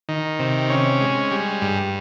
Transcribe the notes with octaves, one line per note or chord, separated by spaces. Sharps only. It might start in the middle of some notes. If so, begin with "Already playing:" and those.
D#3
C3
C#4
G#3
G3
G2